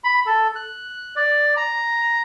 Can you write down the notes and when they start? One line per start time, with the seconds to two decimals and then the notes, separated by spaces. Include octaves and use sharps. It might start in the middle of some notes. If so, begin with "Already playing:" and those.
0.04 B5
0.26 A4
0.55 F#6
1.16 D5
1.57 A#5